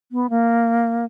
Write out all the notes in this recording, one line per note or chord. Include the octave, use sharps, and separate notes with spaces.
B3
A#3